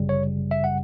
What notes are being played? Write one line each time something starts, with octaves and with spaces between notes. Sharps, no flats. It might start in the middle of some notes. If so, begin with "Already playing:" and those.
Already playing: G1 F#2 C#3 G3
C#5
E5
F#5